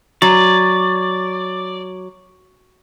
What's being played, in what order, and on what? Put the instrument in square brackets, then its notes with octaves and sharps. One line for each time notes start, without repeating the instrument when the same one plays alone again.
[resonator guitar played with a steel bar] F#3 [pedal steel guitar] D5